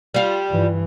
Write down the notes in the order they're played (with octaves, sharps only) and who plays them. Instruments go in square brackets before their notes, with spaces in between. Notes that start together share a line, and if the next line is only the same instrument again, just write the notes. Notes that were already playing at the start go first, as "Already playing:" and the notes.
[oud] G3 F4
[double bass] G2 E3